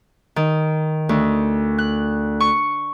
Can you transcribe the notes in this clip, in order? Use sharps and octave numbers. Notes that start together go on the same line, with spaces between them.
D#3
D2
F#6
C#6